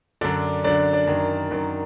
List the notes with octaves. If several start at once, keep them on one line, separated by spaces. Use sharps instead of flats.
F#2 D3 D4 D5
F#2 D3 D4 D5
D4 D5
F#2 D#3
F#2 D#3